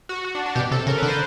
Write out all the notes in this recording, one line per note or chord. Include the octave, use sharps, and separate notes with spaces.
F#4
F#4
D4
D4
B2 G4
C3 A4
C#3 A#4
B4
D3
C5